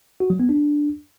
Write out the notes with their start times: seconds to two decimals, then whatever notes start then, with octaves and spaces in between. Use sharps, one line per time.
0.20 F#4
0.30 F#3
0.40 B3
0.49 D4